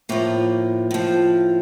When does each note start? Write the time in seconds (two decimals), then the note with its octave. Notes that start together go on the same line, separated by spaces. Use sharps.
0.09 A2 F3 A#3
0.91 A2 F3